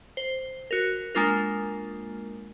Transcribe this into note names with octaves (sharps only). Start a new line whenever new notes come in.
C5
F#4 A#4
G#3 A#3 D4 F4 A#4